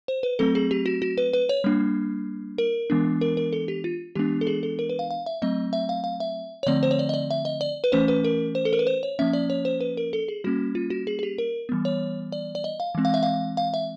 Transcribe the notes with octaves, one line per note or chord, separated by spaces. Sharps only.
C5
B4
F#3 A3 C4 A4
G#4
G4
F#4
F#4
B4
B4
C#5
G3 A#3 D4
A#4
E3 G#3 B3 D4
A#4
A#4
A4
G4
F4
E3 G#3 B3 D4 G4
A4
G#4
A4
A#4
B4
F5
F5
E5
F#3 A3 C4 D#5
E5
F5
F5
E5
C#5
D3 F3 A3 C4 D5
C5
C#5
D5
D#5
D5
E5
D#5
D5
B4
E3 A3 C#4 C5
B4
A#4
C5
A4
A#4
B4
C5
C#5
F3 A#3 C#4 E5
D5
C#5
C5
B4
A#4
A4
G#4
G3 A#3 C#4 F#4
F4
F#4
G#4
G#4
G4
A#4
E3 G3 B3
C#5
D5
D5
D#5
F5
E3 G#3 C4
F5
E5
F5
F5
E5